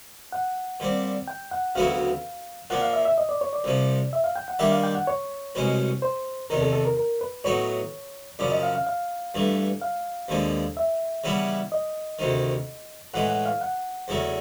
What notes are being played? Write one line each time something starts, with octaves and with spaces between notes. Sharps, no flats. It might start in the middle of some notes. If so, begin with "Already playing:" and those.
F#5
A#2 G3 C4
G5
F#5
D2 C#3 F#3 B3 E4 F5
A#2 F3 A#3 F#5
F5
E5
E5
D#5
D5
C#5
D5
C2 C3 F3
E5
F5
G5
F#5
D#3 G3 A#3 D4 G4 E5
F5
G5
F#5
C#5
C2 B2 G#3 C#4
C5
E2 C3 D#3 A#4
A4
A4
A#4
A#4
B4
A2 F#3 B3 D#4 C#5
F#2 C#3 F3 D5
D#5
F5
F5
F5
G2 E3 A3
F5
D#2 D3 F3 G#3
E5
C#3 E3 G3 B3 E4
D#5
D2 C3 D#3
A2 E3 G#3 F#5
F#5
F5
F#5
E2 C#3 F#3 A3